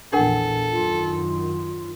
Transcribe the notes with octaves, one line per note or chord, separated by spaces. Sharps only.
A#1 E2 D4 A4 A#4 F#5
F#2 D#3 F4